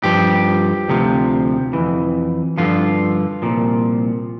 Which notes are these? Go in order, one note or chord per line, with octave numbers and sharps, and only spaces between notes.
G2 F3 G4
D2 C3 F3
F2 E3
G2 D3 F3 F4
C2 A#2 F3